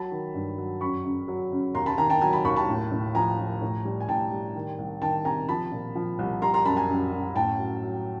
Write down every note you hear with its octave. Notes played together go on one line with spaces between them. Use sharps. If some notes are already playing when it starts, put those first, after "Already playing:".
Already playing: F#3 A5 B5
D#3
G2
F#3
F#2 B5 C#6
C#3
F#3
C#3
D#2 A#5 C6
A5 B5
D#3 G#5 A#5
G5 A5
F#3 G#5 A#5
A5 B5
D#2 B5 C#6
A5 B5
A2
A2
F3 G#5 A#5
F3
A2
G3
G#5
A2 G5 A5
G3
D#3
C2
D#3 G5 A5
C3 G#5 A#5
F3 A5 B5
A#2
F3
C2
G3 A#5 C6
A#5 C6
F#2 A5 B5
G#5 A#5
F#2
F#2
A2 G5 A5
F#3
F#3